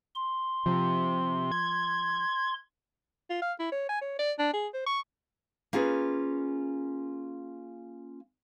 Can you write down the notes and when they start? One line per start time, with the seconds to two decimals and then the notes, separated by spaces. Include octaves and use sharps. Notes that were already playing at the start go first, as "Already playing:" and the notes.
0.15 C6
0.66 C3 F3
1.52 G#6
3.30 F4
3.42 F5
3.60 E4
3.72 C#5
3.89 G#5
4.02 C#5
4.19 D5
4.39 D4
4.54 G#4
4.74 C5
4.86 C#6
5.73 A#3 C#4 F4 G#4 B4